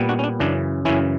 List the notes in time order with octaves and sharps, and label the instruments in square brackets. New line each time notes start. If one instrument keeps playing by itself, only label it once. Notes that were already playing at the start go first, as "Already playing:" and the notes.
Already playing: [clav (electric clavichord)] A#2 G3 B3
D4 F#4
C#4
D4
F#2 C#3 E3 D4
F#2 C#3 E3 C#4 E4